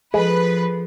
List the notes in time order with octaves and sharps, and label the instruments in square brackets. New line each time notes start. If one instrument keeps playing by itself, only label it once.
[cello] F3 [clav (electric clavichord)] G#3 [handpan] G#4 A4 [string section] B4